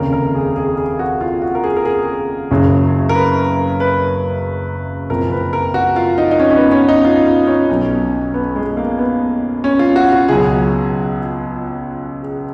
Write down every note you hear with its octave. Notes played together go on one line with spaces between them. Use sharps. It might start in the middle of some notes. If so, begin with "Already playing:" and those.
Already playing: F1 D#2 C#3 A#4
A#4
G#4
G#4
G#4
F#4
F4
F#4
A#4
G#4
A#4
G#4
F#1 F#2 C#3 F#3
A#4
B4
B4
F#1 F2 F3 A#4
B4
A#4
F#4
F4
D#4
D#4
C#4
C#4
B3
C#4
D#4
F4
F4
C#4
B1 B2 F#3
B3
G#3
A#3
B3
C#4
F4
F#4
F#4
C#2 B2 F#3 G#4
G#4